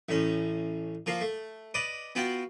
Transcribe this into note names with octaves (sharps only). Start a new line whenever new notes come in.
A1 A2 C#4
F3 A#3 F4
A3
B4 D5 D#5
B3 F4 F#4 G5